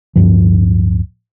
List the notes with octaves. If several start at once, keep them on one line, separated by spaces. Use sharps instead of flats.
D1 G#1 G2 F3